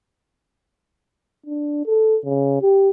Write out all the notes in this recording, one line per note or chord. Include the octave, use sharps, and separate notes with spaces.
D4
A4
C#3
G4